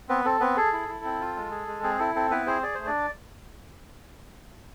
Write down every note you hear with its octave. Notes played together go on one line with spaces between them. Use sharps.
B3 C4 B4
C4 A4
B3 C4 B4
G#4 A4
E4
E4
C4
F4
G#3
G#4
G#3
C4 G#4
E4 A4
C4 A4
B3 E4 B4
C4 G#4 C5
G#4 D5
A3 C5
D4 D5